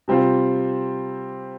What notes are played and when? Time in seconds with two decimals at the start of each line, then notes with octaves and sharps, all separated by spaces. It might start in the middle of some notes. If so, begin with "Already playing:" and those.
0.08 C3 G3 C4 F4 C5